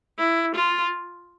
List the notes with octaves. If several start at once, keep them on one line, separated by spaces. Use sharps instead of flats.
E4
F4